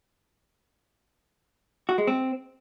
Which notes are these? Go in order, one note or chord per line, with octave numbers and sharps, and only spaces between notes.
F#4
G#3
C4